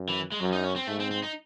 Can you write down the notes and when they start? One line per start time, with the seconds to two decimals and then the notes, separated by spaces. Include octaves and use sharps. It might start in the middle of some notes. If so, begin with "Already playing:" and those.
Already playing: F#2
0.09 E3
0.32 G#3
0.40 F#2 F#3
0.53 D#4
0.64 C#4
0.76 C4
0.87 G#2 A3
1.00 C4
1.11 C4
1.23 D#4